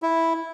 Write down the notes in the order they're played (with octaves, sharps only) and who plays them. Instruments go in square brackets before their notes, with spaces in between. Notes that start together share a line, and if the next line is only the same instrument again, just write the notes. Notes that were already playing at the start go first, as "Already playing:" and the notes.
[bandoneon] E4